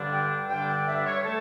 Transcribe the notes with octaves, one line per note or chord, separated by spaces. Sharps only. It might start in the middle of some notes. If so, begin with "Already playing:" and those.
Already playing: G2 D3 G3 D4
G5
G2 D3 G3 D4 G5
G5
E5
C#5
A3 A4